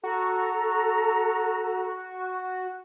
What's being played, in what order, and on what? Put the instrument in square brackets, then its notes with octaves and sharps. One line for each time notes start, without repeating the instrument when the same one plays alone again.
[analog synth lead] F#4 [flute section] A4 A#5